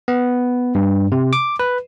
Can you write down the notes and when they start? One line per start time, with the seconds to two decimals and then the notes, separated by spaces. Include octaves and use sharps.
0.08 B3
0.75 G2
1.12 C3
1.33 D6
1.59 B4